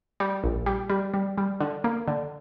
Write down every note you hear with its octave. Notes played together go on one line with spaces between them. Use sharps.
G3
A#1
G3
G3
G3
G3
D3
A#3
D3